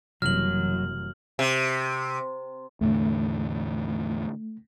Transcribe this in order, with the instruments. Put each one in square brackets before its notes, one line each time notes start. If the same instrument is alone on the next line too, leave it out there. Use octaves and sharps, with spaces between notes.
[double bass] F#1 F#2 [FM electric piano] C3 E3 G3 [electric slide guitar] F#3 [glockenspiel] F6 F#7
[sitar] C3
[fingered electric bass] E2 A2 D3 [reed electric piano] A3